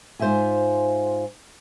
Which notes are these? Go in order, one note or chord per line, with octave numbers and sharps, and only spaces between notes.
G#2 F4 C5 D#5 E5 G#5